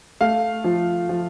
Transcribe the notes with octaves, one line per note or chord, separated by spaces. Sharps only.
A3 F5
F3
F3